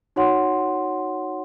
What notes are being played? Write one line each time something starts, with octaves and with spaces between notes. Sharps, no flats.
D#4 F#4 C#5 F#5 C6